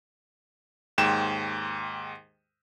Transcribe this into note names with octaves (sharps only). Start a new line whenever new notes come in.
D#2 G#2 G5 E7